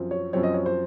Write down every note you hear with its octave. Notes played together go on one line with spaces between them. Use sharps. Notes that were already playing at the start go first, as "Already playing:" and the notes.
Already playing: F#2 F3 C4
C#5
F#2 F3 C4 C#5
D#5
C#5
C5